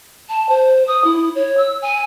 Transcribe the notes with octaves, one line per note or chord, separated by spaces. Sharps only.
A5
C5
D#6
E4
C#5
E6
G#5